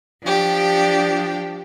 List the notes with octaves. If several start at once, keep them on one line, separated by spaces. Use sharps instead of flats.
F3 D4 G4